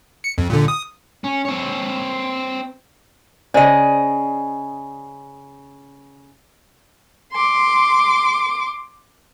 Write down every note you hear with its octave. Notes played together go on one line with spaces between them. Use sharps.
C#7
F2
A#2 D3
D#6
C#4
C4 C#5
C#3 C5 D5 D#5
C6 D6